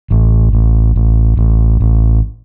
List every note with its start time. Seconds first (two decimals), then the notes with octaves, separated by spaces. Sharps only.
0.11 A1
0.53 A1
0.96 A1
1.37 A1
1.80 A1